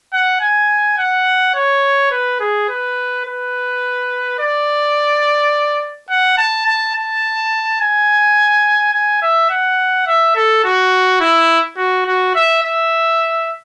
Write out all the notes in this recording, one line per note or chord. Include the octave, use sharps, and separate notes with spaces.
F#5
G#5
F#5
C#5
B4
G#4
B4
B4
D5
F#5
A5
A5
A5
G#5
G#5
E5
F#5
E5
A4
F#4
E4
F#4
F#4
E5
E5